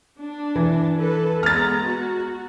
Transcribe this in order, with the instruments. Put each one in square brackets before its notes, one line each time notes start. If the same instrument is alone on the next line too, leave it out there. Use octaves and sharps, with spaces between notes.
[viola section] D4
[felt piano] E3
[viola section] A4 B4
[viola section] G#3 B3 A#5 [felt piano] F6 A6
[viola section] F#4